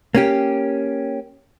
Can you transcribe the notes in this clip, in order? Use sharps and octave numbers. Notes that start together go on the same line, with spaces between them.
A#3 C#4 G4